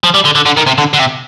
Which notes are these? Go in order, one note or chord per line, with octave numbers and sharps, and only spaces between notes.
F3
G3
D3
D3
D3
D#3
C3
D3
D3
C3